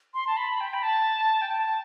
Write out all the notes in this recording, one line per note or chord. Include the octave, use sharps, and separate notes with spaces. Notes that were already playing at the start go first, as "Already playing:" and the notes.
C6
A5
B5
G5
B5
A5
G5
A5